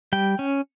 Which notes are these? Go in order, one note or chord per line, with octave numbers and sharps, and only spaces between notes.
G3 G5
C#4